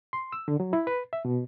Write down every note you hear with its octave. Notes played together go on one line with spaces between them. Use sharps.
C6
E6
D3
F#3
E4
B4
E5
B2